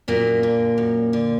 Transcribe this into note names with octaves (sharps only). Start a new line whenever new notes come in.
F#2 A#2 A#3
D3
F#2
D3